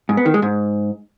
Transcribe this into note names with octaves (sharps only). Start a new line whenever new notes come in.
G#2
B3
D#3
G#3
G#2